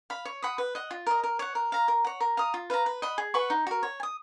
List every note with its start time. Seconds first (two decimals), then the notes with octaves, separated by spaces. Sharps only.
0.10 F5 B5
0.25 C#5
0.42 F#5 B5 D#6
0.58 B4
0.75 D#5 F#5
0.91 F4
1.06 A#4 D#5
1.24 A#4
1.39 C#5 F#5
1.55 A#4
1.72 F5 A#5
1.88 A#4
2.05 C#5 F#5
2.20 A#4
2.37 F5 A#5 D#6
2.54 F4
2.70 B4 F5 A#5
2.86 B4
3.02 D#5 F#5 B5
3.18 G#4
3.34 B4 F#5 C#6
3.50 D#4
3.67 F#4 A#4
3.83 C#5
4.00 G#5
4.03 D#6